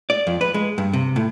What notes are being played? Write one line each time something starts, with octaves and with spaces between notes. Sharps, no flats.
D5
F2
B4
G#3
G2
C3
A2